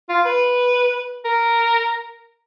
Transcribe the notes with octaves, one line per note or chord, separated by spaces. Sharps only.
F4
B4
A#4